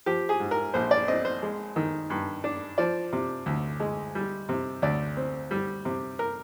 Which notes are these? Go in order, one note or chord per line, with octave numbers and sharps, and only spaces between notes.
F3 G4
G#4
G#2
A#4
A#1 C5
D5
C4 D#5
C5
G#3
D#3
G2
D4
F3 D5
C3
D2
G#3
G3
C3
D2 D5
C4
G3
C3
A#4